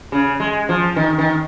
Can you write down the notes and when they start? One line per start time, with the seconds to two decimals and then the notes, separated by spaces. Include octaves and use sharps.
0.12 C#3
0.40 G#3
0.69 F3
0.96 D#3
1.18 D#3